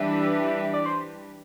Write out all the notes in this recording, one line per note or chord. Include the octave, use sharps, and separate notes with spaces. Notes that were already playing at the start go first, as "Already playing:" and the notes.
Already playing: E3 G3 D4 G4 B4 E5
D5
C5